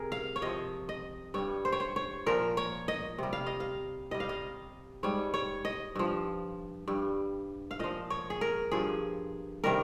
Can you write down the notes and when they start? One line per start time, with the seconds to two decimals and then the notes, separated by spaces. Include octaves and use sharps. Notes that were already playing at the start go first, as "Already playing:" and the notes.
Already playing: C3 G#4 A#4
0.12 F5
0.36 C#5
0.42 C3 F3 D#5
0.89 D#5
1.34 G2 G3 C#5
1.65 C5
1.72 C#5
1.80 C5
1.96 C#5
2.26 A#2 F3 A#4
2.57 C#5
2.88 D#5
3.18 C3 G3
3.33 F5
3.46 D#5
3.60 F5
4.11 C3 G3 D#5
4.20 F5
4.29 D#5
5.03 G#2 G3 C#5
5.34 C#5
5.65 D#5
5.96 G2 F3
6.88 G2 G3
7.71 F5
7.79 A#2 F3 D#5
8.10 C#5
8.30 G#4
8.41 A#4
8.72 G2 F3 G#4
9.64 C3 D#3 G3 A#4